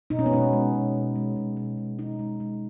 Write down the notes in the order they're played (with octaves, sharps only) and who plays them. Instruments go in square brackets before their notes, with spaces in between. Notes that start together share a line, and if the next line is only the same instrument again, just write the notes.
[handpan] B2 D#4
C#4
B3
G#3 C#4
G#3
B2
G#3
G#3
B2
G#3
B2
G#3 D#4
G#3
G#3